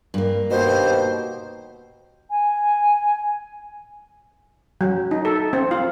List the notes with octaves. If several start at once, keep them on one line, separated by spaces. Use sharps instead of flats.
G2 A#3
D#2 B2 C5
G#5
F#3
D#4
A4
C4
F4